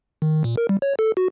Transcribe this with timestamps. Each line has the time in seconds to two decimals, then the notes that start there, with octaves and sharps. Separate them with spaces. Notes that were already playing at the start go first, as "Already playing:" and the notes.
0.22 D#3
0.44 A#2
0.57 A#4
0.69 G3
0.82 C#5
0.99 A4
1.17 F#4